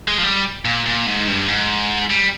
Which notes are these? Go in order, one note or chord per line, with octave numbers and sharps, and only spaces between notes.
G#3
F3
G3
A#2
A#2
G#2
G2
G#2
G3